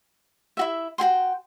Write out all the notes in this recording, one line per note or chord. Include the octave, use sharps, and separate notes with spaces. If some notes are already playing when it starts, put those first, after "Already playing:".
E4 F#4 E5
F#4 G#4 G5 C6